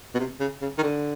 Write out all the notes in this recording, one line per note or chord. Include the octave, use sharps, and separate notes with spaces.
B2
C3
C#3
C#3
D#3
D3